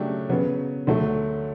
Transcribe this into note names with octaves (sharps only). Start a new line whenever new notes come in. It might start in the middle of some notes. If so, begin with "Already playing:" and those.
Already playing: C#3 F#3 A3 D4 G4
C#3 F#3 B3
D2 D3 F#3 A3